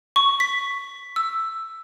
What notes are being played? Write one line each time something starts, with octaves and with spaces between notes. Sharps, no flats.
C#6
B6
E6